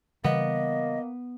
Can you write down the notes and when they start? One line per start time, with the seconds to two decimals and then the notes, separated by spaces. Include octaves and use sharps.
0.24 C#3 E3 G3 A#3 B3 D#5